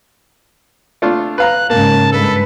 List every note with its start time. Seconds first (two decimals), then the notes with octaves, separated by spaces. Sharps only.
1.02 A3 D4 F4
1.38 B4 F5 A#5 F#6
1.70 G#2 C#3 A#3 A5
2.12 G2 G#3 A4 B4